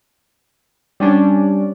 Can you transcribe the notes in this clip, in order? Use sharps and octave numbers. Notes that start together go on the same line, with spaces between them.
G3 C#4 D4